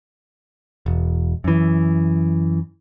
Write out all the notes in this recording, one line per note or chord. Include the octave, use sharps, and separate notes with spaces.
E1
F#2 E3